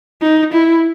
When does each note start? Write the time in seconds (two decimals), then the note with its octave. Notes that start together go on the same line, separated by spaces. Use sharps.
0.22 D#4
0.53 E4